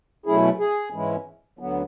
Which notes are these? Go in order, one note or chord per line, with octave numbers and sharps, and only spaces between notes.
B2 F#3 A3 C#4 E4 G#4
G#4
G#2 E3 G#3 C#4 E4
D2 D3 F#3 B3